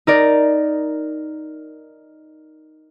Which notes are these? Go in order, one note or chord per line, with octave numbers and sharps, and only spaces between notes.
D#4 A#4 D5